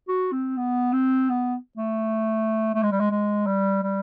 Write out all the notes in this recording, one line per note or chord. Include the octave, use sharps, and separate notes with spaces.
F#4
C4
B3
C4
B3
A3
A3
G#3
G3
G#3
G#3
G3
G3